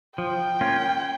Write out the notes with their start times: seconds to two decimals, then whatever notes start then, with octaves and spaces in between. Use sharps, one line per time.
0.18 F3 G5
0.61 A#3 C#4 F4